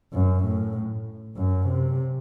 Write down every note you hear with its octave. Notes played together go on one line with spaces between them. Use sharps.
F#2
A2
F#2
C3